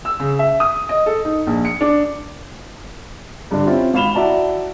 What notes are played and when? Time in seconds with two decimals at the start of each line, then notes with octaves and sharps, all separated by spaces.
0.05 E6
0.19 C#3
0.39 E5
0.60 D#6
0.89 D#5
1.06 A4
1.25 D#4
1.47 A#1
1.65 C#7
1.81 D4
3.51 G2 D3 D4
3.66 C4 C#4 E4 F4
3.94 G#1 F5 B5 E7 F7 G7
4.14 E4 F#4 D5 A5 A#5